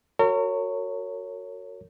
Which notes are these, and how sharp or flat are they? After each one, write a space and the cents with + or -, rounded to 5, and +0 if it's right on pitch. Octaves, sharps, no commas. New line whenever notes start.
F#4 +0 A#4 -40 C#5 +0